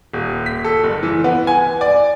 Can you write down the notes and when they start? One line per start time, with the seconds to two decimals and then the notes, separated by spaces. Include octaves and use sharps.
0.13 D#1
0.46 B6
0.64 A4
0.84 F#1
1.03 E3
1.24 B3
1.47 G#5
1.81 D5